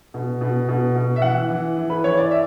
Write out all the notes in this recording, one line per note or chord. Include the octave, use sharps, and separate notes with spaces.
B2
B2
B2
B2
E5
E3 F#5
E3
E3
B4
E3 C#5
D5
E5